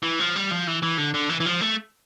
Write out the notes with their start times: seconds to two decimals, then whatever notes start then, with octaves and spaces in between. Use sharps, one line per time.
0.03 E3
0.20 F3
0.36 G3
0.51 F3
0.67 E3
0.82 E3
0.97 D3
1.14 D3
1.29 E3
1.40 E3
1.46 F3
1.61 A3